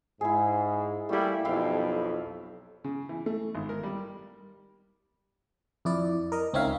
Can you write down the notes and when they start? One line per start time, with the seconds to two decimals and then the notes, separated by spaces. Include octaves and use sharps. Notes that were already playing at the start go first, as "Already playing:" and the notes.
0.21 G#2 E4 G#4
1.09 G3 A3 A#3 E4 G4
1.45 B1 F2 E4 F5 G5
2.84 C#3
3.09 E3
3.26 A3
3.55 G#1
3.69 A#4
3.83 G3
5.85 F2 E4 D5
6.32 A#4 D#5
6.53 C#2 C4 D#4 C#5 E5 F5